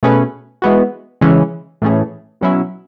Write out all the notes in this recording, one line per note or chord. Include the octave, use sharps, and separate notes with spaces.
B2 A3 C#4 G#4 B4
E3 G#3 B3 F#4
C#3 E3 G#3 C#4
A2 E3 A3 C#4 G#4
B2 F#3 C#4 E4